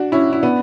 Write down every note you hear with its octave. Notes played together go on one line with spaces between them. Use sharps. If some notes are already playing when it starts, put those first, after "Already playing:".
Already playing: D4 F#4
C#4 E4
E4
B3 D4